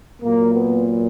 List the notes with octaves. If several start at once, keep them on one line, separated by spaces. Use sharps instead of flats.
A#2 F#3 A#3
B3